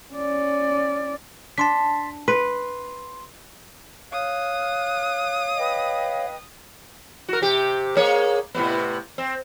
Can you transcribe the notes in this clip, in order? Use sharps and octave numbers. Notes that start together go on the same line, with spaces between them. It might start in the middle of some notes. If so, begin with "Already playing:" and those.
C#4 D5
D4 A5 C6 B6
B4 C6
C#5 F5 D#6 F6 F#6
B4 D#5 G5
F#4 A#4
C3 G4
A#3 G#4 C#5
A2 C3 B3
C4